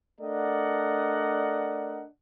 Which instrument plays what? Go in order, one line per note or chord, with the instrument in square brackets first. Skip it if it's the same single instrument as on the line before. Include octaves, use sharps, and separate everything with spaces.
[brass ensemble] A3 D4 A#4 D5 D#5 F#5